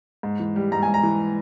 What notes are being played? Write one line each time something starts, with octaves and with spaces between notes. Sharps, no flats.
G#2
E3
G3
G#2 A#5
G#5
G#2
A#5
E3